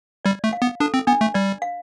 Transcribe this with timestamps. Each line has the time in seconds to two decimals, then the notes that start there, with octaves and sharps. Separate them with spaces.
0.25 G3 D5
0.44 A3
0.53 F5
0.62 B3
0.80 D4 A4
0.94 C4
1.07 B3 D4
1.21 A3
1.34 G3 D5
1.62 F5